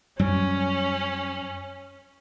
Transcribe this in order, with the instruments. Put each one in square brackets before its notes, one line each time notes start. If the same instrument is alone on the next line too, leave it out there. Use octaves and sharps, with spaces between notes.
[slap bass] F#2 G3 [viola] C#4